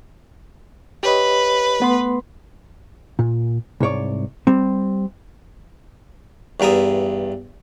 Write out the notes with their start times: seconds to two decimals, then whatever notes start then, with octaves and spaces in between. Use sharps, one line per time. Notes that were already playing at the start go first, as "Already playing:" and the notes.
1.03 G4 B4 C#5 D#5
1.80 A3 B3 C6
3.19 A#2
3.80 C2 G#2 C#5 D5
4.47 G3 C4
6.60 E2 G2 A#4 E5 D#6